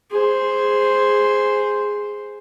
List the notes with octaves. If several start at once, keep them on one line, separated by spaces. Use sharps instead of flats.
G#4 C5